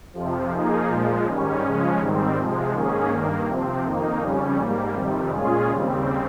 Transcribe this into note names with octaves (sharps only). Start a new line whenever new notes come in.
F2 C3 F3
F3 A#3 D#4 G#4
A#2 F3 G#3
G#2 D#3 G3 C#4
C#3 F3 G#3 C#4
G#2 D#3 G3 C4
C3 F3 G#3
G#2 D#3 A#3 C#4 G#4
G2 D#3 A#3
C3 F3 C4
F2 D#3 A#3 D#4
F2 C#3 G3 C#4
G#2 G3 A#3
F2 C3 D#3 G3
A#2 G#3 C#4 F4 G#4
D#2 C#3 G3 C4